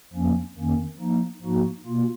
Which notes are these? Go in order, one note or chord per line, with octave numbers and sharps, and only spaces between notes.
F2 F3 A#3 C#4
F2 D#3 A#3 C#4
F3 A#3 D#4
G#2 F3 A#3 D#4 F#4
B2 A#3 F4